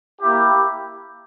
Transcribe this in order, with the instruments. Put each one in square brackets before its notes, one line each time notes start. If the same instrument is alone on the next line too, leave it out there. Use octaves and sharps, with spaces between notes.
[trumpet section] A#3 E4 G4